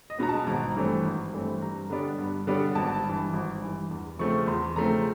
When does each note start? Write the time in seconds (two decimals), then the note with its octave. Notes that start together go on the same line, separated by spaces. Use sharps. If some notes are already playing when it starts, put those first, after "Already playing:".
0.10 D#5
0.19 B2 G#3 B3 A#5
0.29 A5
0.47 G#1 A#5
0.75 G2 E3 A3 C4
1.05 G#1
1.33 G2 E3 A3 C4
1.62 G2 A#5
1.90 D3 G3 B3 D4
2.18 G2
2.47 D3 G3 B3 D4
2.75 G#1 A5
3.04 G2
3.09 E3
3.33 G#1
3.62 G2 E3
3.91 E2
4.19 C#3 F3 A3 C4 C#6
4.47 E2 C6
4.76 C#3 F3 A3 C4 A#5